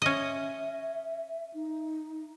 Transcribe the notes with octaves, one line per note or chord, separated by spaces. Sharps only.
C#4 D#5 E5
D#4